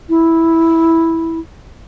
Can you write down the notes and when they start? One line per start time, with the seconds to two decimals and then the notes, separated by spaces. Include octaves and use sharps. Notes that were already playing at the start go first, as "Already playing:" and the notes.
0.09 E4